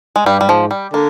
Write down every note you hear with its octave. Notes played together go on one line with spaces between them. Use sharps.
G#3
G2 G3
G3
G#2 F3
G3
D3 A#3